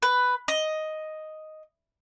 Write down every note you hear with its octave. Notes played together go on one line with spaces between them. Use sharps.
B4
D#5